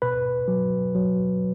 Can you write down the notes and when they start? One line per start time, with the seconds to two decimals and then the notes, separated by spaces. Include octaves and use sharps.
0.02 B2 B4
0.48 F#3
0.95 F#3